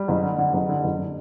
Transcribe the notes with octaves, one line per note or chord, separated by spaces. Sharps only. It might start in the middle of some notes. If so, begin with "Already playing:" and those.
Already playing: G3
F#1
D3
D3
F#1
D3
F#1
D3